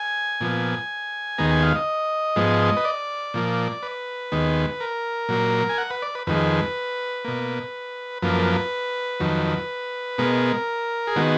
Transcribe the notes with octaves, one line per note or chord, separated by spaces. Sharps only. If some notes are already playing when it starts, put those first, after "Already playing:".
Already playing: G#5
A#2 F3 B3
D#2 D#3 G#3 B3 A#5
G#5
F5
D#5
G#2 F3 G#3 B3
B4
D5
A#2 F3 A#3
B4
D#2 D#3 G#3 B3
A#4
A#2 F#3 A#3
G#5
F#5
B4
D5
B4
F2 D#3 G#3 B4
B2 A#3
F#2 F3 A#3 B4
F2 D#3 F#3
B2 G#3 B3 A#4
G#4
D#3 G#3 B3 F#4